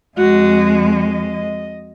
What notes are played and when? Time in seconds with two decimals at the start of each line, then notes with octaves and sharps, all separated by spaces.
0.17 F2 G#3 F#4
0.87 D#5